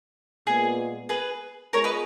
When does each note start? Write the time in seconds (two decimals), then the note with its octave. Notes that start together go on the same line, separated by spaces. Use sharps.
0.46 A#2 G#3 B3 F4 G#4 A#4
1.09 G#4 B4
1.73 G#3 B3 F4 G#4 A#4 C#5
1.84 B4 D#5